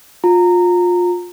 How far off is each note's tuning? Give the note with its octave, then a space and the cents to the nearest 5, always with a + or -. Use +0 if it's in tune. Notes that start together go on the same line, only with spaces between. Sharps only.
F4 +25 A#5 -20